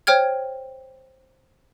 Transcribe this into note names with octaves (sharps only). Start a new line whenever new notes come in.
C5 C#5 G5 F6 G#6